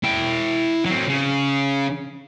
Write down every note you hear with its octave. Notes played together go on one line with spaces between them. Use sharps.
E4 G5
F#3 C4
C#3